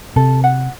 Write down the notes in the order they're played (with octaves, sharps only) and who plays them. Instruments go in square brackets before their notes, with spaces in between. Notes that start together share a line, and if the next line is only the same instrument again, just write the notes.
[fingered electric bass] C3 [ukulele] A4
[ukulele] F#5